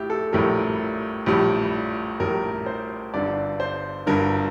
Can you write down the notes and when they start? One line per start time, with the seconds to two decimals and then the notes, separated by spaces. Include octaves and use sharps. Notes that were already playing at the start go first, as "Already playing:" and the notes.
Already playing: A#1 A2 E4 G4
0.10 A4
0.33 A#1 A2 G3 A#4
1.26 A#1 A2 G3
2.20 A#1 A2 G3 A#4
2.66 C5
3.14 G1 G2 D3 D5
3.60 C5
4.07 G1 G2 D3 A#4